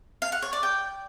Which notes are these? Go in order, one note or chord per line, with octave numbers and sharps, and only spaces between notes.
F5
F#5
C#5
D5
G5